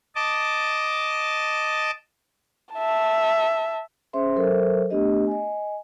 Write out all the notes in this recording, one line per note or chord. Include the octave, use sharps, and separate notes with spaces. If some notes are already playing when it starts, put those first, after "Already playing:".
D#5 A5 D6
E5 A5
C#4 G#4 C5 E5 C6
F#3 A4 A#4 C5 E5
A3 B3 D4 G4 D#5
D#5 G#5